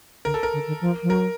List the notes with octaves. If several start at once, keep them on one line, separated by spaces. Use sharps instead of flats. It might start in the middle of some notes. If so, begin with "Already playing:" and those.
D3 A#4
A4
A#4
D3
D#3
F3
F3
F#3 A#4